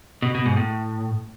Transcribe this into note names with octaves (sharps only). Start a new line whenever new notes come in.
B2
B2
G#2
A2